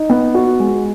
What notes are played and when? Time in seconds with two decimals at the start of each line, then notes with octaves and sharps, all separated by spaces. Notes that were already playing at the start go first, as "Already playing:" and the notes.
Already playing: D#4
0.10 B3
0.34 F#4
0.60 G#3